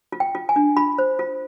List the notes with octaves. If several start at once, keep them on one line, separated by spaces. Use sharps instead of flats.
F4
G5
F4
G#5
D4
F4 B5
C5
F4